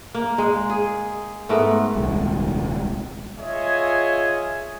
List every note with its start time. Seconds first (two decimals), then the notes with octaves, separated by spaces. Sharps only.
0.15 A#3
0.38 G#3
0.70 G#4
1.49 G#2 A3 B3 A#4
1.95 D#1 C2 G#3
3.38 F4 G#4 C#5 D#5 E5 G#5